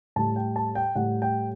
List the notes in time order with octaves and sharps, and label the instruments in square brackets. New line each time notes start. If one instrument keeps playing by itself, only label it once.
[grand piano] A2 G3 A5
G5
A5
G5
A2 G3 F#5
G5